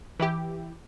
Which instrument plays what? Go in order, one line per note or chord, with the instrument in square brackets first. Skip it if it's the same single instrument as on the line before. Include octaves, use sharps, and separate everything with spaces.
[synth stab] E3 E4 G4